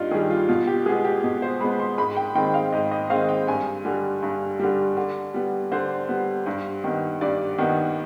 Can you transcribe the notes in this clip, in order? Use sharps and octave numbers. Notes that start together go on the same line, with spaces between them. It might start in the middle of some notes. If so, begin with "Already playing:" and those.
Already playing: G2 D4 D#4 F4
D#3 G3 G#4
F4
B2 F4
G4
G#3 B3 G#4
G4
B2
C5
G#3 B3 B5
C6
G#2 B5
G5
D#3 G#3 C4 G5
F5
G#2 D#5
D#5
D#3 G#3 C4 F5
G5
G2 G#5
D3 G3
G2
D3 G3
D3
G3 B3
D3 C5
G3 B3
G2
D#3 B3
G2 D5
D#3 B3